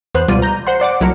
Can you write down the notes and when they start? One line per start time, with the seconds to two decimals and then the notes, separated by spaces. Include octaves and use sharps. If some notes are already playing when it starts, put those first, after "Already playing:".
0.15 E2 B3 C5 F#6
0.28 C#2 B2 G3 F4 D5 D#7
0.42 A#5 G6
0.67 C5 F#5 C6
0.80 C5 D5 F#5 D6
1.01 C2 F#3 A3 E4 A#4 C#7